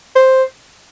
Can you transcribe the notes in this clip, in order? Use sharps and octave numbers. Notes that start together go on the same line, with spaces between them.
C5